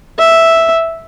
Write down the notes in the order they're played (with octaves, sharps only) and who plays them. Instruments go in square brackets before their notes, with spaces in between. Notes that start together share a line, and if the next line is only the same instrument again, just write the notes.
[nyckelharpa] E5